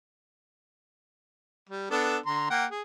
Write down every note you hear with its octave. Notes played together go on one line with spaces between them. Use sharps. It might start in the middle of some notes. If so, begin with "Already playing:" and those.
G3
B3 D4 A4
D3 A#5 C6
A#3 F#5 G5
G#4